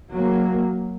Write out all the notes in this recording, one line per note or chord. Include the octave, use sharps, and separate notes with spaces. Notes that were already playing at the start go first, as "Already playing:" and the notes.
F#3 A#3